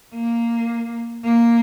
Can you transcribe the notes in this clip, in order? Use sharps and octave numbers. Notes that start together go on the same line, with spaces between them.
A#3
A#3